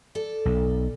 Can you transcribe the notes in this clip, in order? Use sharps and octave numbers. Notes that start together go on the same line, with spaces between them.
A4 D5
B1